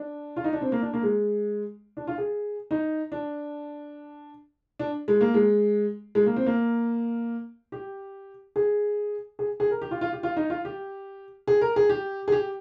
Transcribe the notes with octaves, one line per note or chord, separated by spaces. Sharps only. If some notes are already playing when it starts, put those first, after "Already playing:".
Already playing: D4
F4
D#4
D4
C4
A#3
D4
A#3
G#3
D4
F4
G#4
D#4
D4
D4
G#3
A#3
G#3
G#3
A#3
C4
A#3
G4
G#4
G#4
G#4
A#4
G4
F4
F4
G4
F4
D#4
F4
G4
G#4
A#4
G#4
G4
G#4
G4